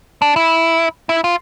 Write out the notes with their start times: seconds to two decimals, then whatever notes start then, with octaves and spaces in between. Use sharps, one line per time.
0.22 D4
0.36 E4
1.09 E4
1.24 F4